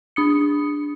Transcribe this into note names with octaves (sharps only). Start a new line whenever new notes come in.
D4 D#6 C#7